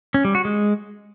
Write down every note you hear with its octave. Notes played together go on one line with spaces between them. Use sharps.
C#4
G3
F#4
G#3